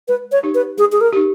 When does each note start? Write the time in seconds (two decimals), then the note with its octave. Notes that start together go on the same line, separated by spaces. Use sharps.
0.08 G#3 B4
0.32 C#5
0.43 D#4 G4
0.55 B4
0.77 G#3 G#4
0.92 G#4
1.01 A#4
1.13 D#4 G4